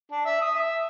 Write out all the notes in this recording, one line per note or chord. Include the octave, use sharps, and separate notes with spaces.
D4
E5
D#6
E5